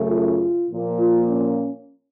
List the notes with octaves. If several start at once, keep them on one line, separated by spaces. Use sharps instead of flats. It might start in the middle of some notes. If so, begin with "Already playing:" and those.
Already playing: F#2 C#3 A3
F4
A#2 F3 A#3
F4
C#4